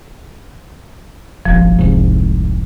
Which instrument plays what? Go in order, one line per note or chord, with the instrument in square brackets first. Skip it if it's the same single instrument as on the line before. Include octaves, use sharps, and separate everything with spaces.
[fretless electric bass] D#1 G#1 [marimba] F3
[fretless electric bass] E1 C2 G#2